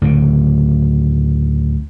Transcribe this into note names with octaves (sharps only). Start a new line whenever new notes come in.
D2 A2 C#3